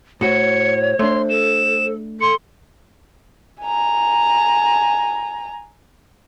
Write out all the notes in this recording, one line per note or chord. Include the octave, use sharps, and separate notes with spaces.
A2 F#4 C5 C#5 C#7
A3 D4 C6
A4 E7
A4 C6 C#7
G#5 A#5